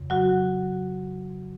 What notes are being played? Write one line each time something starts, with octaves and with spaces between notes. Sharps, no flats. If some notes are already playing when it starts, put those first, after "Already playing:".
Already playing: F2 C#3
F#3 F#4